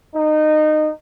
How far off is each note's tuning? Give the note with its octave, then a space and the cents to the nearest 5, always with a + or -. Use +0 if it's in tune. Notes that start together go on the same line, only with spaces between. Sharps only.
D#4 -20